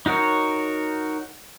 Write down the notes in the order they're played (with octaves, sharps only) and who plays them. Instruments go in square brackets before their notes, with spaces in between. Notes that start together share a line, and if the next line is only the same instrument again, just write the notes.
[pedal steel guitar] D#4 F#4 A#4 C#5